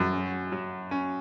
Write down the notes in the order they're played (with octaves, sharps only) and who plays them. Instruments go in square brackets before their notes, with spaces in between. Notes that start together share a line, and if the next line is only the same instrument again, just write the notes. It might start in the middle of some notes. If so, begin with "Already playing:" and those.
Already playing: [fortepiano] F#2 [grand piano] F#3
[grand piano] C#4
F#3
C#4